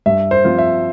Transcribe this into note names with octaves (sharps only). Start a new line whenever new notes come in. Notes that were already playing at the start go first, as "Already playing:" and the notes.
G2 E5
C5
F3 C4 F4
E5